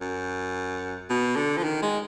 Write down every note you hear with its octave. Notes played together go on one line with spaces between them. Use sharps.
F#2
B2
D3
F3
D#3
G#3